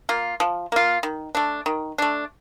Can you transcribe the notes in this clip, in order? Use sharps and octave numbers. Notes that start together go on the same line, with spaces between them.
A#3 F4
F3
A#3 F4
D#3
A3 D4
D#3
A3 D4